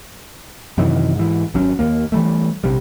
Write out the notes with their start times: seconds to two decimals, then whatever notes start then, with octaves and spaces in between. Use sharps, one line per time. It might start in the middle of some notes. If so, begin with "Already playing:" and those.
0.78 F#2 C3 D#3 E3
1.16 G#2 E3
1.54 G#1 F#3 C#4
1.79 D#2 A#3
2.12 E3 G3 A3
2.64 A#1 C3 G3